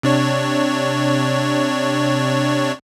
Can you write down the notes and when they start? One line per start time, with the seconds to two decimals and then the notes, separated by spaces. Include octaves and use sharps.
0.03 C3 D4 C#5